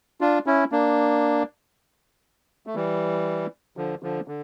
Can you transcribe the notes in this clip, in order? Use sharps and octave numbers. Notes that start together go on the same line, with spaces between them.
D4 F4
C#4 E4
A#3 D4
A3
E3 G3
D3 F3
D3 F3
D3